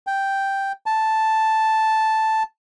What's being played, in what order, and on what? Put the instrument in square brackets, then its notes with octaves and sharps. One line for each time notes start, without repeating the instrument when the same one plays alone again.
[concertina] G5
A5